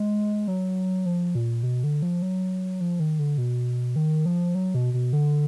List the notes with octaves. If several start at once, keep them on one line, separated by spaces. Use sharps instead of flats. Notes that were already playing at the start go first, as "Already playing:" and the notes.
Already playing: G#3
F#3
F3
A#2
B2
D3
F3
F#3
F3
D#3
D3
B2
D#3
F3
F#3
B2
B2
D3